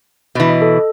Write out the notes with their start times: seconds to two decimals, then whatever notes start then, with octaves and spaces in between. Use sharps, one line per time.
0.35 B2 E3
0.50 D#5
0.62 A4